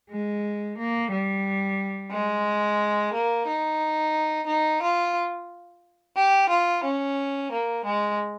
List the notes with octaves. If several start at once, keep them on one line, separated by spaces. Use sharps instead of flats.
G#3
A#3
G3
G#3
A#3
D#4
D#4
F4
G4
F4
C#4
A#3
G#3